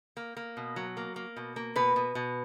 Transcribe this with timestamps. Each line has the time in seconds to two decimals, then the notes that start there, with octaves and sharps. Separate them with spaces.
0.17 A#3
0.37 A#3
0.57 B2
0.76 F#3
0.97 A#3
1.16 A#3
1.37 B2
1.56 A#3
1.76 B2 B4
1.96 B2
2.15 B2